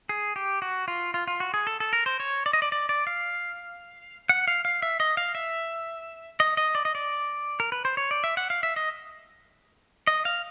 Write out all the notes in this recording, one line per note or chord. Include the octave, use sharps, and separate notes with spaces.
G#4
G4
F#4
F4
F4
F4
F#4
G#4
A4
A4
A#4
C5
C#5
D5
D#5
D5
D5
D5
F5
F#5
F5
F5
E5
D#5
F5
E5
D#5
D#5
D5
D#5
D5
A#4
B4
C5
C#5
D5
E5
F#5
F5
E5
D#5
D#5
F5